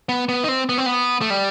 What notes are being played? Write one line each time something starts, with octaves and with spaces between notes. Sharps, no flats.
B3
B3
D#4
C4
B3
C4
B3
A3
G3